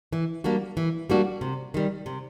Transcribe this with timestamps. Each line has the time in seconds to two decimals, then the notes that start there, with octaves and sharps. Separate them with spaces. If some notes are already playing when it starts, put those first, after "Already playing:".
0.13 E3
0.44 G3 A#3 D4 F#4
0.77 E3
1.10 G3 A#3 D4 F#4
1.41 C3
1.74 D#3 G3
2.06 C3